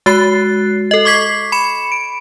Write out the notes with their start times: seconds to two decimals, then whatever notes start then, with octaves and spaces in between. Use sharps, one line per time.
0.06 G#3 F#4 F#6 C7
0.91 A4 D#5
1.05 C#6 D6 G#6 B6 C7
1.52 B5 C#7 E7
1.92 D7